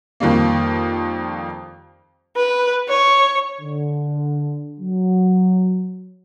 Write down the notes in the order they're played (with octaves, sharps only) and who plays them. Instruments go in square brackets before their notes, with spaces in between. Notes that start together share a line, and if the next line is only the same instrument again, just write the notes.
[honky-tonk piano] F2 D#3 G3 A#3
[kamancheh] B4
C#5
[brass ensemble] D3
F#3